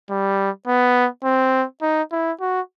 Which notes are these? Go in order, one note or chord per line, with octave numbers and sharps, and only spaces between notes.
G3
B3
C4
D#4
E4
F#4